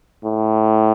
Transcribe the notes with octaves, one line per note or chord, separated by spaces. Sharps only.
A2